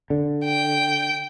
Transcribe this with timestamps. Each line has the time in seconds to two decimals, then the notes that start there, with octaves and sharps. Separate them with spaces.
0.10 D3
0.45 G5